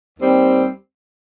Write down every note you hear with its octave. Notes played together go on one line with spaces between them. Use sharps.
D#2 D#3 G3 C4 G4